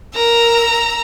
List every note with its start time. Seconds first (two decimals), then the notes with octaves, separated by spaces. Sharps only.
0.16 A#4 A#5 E6